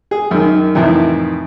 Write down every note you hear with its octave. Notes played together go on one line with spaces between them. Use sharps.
G#4
F#2 D#3
F2 A2 C3 D#3 E3